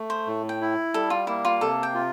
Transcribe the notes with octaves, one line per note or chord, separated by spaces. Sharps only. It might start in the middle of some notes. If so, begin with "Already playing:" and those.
Already playing: A3
C5
A2
G5
E4
G3 A4
F4
A#3 E4
F4
C3 A4
G5
F4